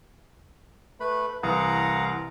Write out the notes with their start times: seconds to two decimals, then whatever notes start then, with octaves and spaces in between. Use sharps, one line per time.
1.00 A3 B4 B5
1.43 C2 E3 F5 F#5 A#5 D#6